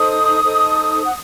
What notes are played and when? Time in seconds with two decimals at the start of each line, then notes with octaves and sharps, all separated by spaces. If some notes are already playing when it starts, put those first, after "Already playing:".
Already playing: D#4 A4 C5 D#6
0.43 D#4 A4 C5
1.03 F#5